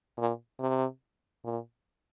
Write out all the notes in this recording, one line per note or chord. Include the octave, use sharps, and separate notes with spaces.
A#2
C3
A#2